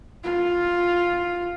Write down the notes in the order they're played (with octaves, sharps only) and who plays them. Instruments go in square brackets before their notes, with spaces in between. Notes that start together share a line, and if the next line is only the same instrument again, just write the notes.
[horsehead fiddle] F4